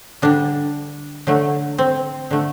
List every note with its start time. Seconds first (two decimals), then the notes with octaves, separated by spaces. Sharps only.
0.22 D3 G3 D4
1.27 D3 F#3 A3
1.78 C4
2.31 D3 A3